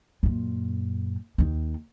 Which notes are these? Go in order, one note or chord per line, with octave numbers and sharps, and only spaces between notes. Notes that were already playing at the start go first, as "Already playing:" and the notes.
F#2 A#2
D#2 D#3